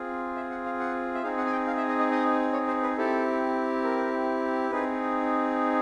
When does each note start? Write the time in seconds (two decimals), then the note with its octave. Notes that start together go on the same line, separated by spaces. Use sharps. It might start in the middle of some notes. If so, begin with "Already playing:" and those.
Already playing: C4 F4 G#4
0.36 E5
0.51 F#5
0.66 F5
0.80 F#5
1.14 E5
1.23 C4 D#4 G#4 F5
1.38 F#5
1.46 G#5
1.52 G5
1.67 F5
1.77 E5
1.88 D#5
1.99 D#5
2.11 D#5
2.53 C#5
2.68 C5
2.83 B4
2.97 C4 E4 G4 A4
3.84 A#4
4.71 C4 D#4 G#4 B4